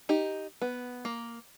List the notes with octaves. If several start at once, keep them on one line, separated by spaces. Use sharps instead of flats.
D#4 G4
B3
A#3